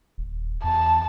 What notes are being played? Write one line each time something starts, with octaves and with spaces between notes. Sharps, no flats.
D#1
E2 A5